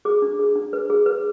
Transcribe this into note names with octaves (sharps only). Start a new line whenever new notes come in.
G#4 D6
D4
G#4
D4
B4
G#4
B4